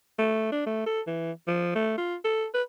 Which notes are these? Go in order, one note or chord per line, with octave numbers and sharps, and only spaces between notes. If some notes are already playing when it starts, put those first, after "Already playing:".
A3
D4
A3
A4
E3
F3
A3
F4
A4
B4